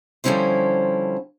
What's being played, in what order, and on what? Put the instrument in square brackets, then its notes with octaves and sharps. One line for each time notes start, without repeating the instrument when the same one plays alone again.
[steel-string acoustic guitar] D3 F3 G3 C#4 E4 C5